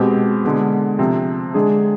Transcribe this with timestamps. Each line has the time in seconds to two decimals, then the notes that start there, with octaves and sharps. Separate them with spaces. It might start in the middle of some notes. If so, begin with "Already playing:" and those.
Already playing: B2 G#3 C4 G4
0.44 D3 G#3 B3
0.99 C3 F3 C4
1.54 D3 G#3 D4 G#4